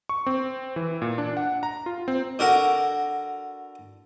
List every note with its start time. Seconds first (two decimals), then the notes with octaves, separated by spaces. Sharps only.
0.09 C#6
0.26 C4
0.76 E3
1.02 A#2
1.18 D4
1.37 F#5
1.63 A#5
1.86 F4
2.08 C4
2.39 D3 F#4 A#4